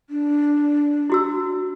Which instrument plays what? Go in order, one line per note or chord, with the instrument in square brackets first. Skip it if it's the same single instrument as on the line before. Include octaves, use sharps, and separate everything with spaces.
[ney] D4
[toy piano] E4 F#4 E6